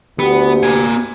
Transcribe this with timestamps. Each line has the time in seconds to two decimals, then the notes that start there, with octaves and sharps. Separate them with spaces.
0.19 D2 B3 G4
0.63 A#3 G#5